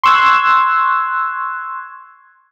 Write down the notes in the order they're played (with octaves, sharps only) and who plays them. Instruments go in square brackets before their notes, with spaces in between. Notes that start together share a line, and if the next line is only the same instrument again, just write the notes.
[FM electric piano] C6 C#6 E6 F#6 G#6